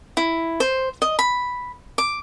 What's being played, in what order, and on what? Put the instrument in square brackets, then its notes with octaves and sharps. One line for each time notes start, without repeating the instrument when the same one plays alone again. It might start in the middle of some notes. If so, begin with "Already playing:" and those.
[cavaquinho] E4
C5
D#5
B5
D6